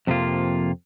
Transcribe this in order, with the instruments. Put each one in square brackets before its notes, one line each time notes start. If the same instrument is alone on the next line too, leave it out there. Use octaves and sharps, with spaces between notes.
[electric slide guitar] F2 C3 F3 A#3 F4